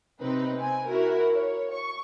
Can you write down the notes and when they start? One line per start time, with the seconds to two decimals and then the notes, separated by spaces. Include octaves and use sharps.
0.21 C3 C4 D#4 B4
0.55 C4 G#5
0.87 E4 F#4 A#4
1.34 C#5
1.73 C#6